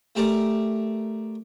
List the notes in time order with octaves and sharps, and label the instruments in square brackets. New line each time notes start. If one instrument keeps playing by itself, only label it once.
[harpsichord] A3 G4 A#4 D5